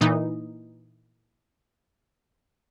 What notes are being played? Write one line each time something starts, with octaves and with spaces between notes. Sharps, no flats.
A#2 E3 D#4